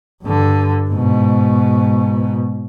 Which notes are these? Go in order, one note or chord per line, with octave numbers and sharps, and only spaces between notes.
G2 D3
G#2 B2